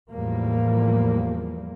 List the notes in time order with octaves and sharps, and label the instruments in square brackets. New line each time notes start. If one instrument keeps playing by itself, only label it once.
[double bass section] E2 A2 F3 G3 A#3